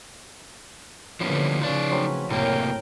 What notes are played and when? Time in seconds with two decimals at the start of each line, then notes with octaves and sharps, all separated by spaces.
1.20 A2 D3 F3 G3 A#3 C#4 B4
1.62 C#3 F3 C#4 D#4 F4 B4 D5
1.91 F#3 A3 C4
2.30 F#1 A2 C3 A#3 A#4 G5